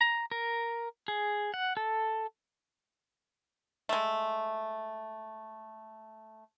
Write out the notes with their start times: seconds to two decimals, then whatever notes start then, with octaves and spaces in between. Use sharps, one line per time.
0.01 A#5
0.32 A#4
1.08 G#4
1.54 F#5
1.77 A4
3.89 G#3 A3